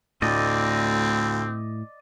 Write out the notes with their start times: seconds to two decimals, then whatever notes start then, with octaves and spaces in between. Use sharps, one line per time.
0.22 D2 A2 C4 D5 D#5